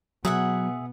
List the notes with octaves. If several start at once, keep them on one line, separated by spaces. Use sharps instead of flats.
B2 F#3 B3 G#4 E5 F#5